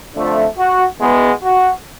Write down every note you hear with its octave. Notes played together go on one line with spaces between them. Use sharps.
F2 D3 F3 A3
F#4
E2 B2 G#3 B3
F#4